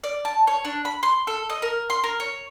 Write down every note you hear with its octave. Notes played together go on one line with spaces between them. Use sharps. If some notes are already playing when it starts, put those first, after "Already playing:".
D5
A5
C#5
D4
B5
C6
A4
D#5
A#4
C6
A#4
C#5